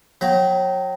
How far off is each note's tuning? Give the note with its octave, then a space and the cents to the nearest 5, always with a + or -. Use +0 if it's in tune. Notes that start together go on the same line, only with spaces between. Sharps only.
F#3 -30 G5 -25 A#5 +0